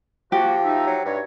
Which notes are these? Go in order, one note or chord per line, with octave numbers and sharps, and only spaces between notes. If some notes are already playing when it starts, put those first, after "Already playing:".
F3 A#3 F#4 G4
D#4 E5
F#3
G2 C#5